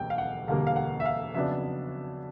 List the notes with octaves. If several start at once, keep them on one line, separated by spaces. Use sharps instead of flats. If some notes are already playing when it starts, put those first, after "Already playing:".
Already playing: E1 D2 D3 G3 A#3 G5
F5
F#5
E1 D2 D3 G3 A#3 F5
F5
F#5
E5
F5
F2 C#3 F#3 B3 D4 E5